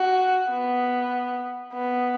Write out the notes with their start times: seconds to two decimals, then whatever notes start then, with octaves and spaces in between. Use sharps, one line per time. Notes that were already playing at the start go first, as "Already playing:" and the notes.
Already playing: F#4
0.50 B3
1.73 B3